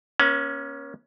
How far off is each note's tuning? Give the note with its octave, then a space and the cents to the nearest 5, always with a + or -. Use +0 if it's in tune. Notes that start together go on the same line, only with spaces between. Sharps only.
A#3 +45 C#4 +0